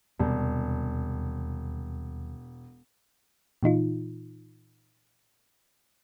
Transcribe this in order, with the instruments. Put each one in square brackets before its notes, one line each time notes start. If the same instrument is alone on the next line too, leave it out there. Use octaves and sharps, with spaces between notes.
[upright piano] E1 [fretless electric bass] D#2 C3 G3
[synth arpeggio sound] A#2 E3 D#4 F4